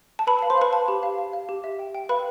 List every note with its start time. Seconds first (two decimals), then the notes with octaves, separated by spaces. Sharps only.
0.19 A5
0.27 B4 B5
0.39 F5 A5
0.50 C5 C6
0.58 B4 F5 B5
0.73 F5 A5
0.88 G4
1.03 F5
1.18 F5
1.33 F5
1.49 G4
1.64 E5
1.79 G5
1.94 G5
2.09 B4 F5 B5